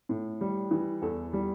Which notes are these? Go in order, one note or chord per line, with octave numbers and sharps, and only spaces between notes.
A2
G3
E3
E2 A4
G3